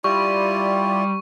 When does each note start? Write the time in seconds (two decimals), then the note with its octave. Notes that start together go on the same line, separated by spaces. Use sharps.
0.04 G3 E4 F4 D5 C#6